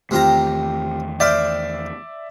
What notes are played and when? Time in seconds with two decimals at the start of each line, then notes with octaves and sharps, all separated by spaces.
0.11 E2 C3 D#3 A3 C4 F4 G4 A#5
1.20 C5 D5 E5 F5 G5